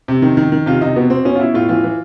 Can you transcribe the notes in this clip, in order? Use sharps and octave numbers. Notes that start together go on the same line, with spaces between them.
C3
D#3
D#3
D#3
C3 F4
C3 D#4
B2 B3
B2 C4
B2 C#4
F4
B2 E4
A2 F4
E3 F4
E3